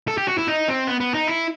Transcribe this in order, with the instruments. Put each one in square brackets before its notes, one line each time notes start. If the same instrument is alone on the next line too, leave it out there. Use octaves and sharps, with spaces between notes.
[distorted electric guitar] A4
G4
F#4
E4
D#4
C4
B3
B3
D#4
E4